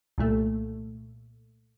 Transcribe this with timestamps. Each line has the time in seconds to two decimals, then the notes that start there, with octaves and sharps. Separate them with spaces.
0.18 C2 A#2 A3